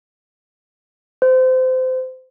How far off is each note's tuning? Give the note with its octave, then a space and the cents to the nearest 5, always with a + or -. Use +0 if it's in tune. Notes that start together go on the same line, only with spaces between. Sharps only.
C5 -25